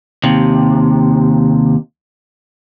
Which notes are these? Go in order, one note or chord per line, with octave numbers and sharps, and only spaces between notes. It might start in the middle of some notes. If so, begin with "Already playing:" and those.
D#2 C3